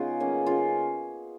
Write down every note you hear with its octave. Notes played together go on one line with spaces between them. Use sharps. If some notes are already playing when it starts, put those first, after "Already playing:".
Already playing: C#3 B3 D#4 F4 G#4
F#3 A#3 C#4
C#3 F4